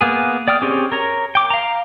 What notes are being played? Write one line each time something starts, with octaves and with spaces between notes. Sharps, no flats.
A#3 B3 G#4
D5 G5 D#6 F6
C4 C#4 G4 G#4
A#4 C#5 A#5
G5 D6
F5 A#5